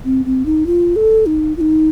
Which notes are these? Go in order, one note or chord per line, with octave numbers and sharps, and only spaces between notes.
C4
C4
D#4
F4
A4
D#4
F4
D#4